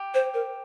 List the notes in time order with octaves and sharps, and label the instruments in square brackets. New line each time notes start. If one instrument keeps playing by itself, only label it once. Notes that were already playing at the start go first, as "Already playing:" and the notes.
Already playing: [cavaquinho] G4
[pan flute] C5
A#4